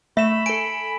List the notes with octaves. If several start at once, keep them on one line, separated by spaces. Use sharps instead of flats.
A3 E5 B5 B6 E7
A4 G#5 D7